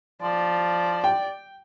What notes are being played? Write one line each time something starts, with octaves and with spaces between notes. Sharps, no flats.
F3 D5
G5